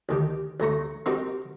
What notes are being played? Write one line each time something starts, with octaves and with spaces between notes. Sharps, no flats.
D2 D#3 G4
D2 A3 A#5 C#6
C4 D#4 F#4 G4 A#4